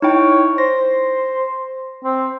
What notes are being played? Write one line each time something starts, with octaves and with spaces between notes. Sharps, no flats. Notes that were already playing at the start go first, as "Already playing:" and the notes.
D#4 E4 C#5 G5
C5 A#6
C4